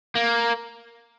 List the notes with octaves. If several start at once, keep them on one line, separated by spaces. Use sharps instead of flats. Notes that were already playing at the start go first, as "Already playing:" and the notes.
A#3